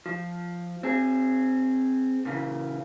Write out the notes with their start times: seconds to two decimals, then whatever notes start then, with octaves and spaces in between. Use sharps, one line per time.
0.06 F3
0.83 C4 G#4
2.25 A#2 C#3 E3